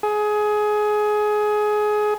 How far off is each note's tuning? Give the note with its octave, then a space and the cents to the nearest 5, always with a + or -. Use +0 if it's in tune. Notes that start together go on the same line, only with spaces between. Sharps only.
G#4 +20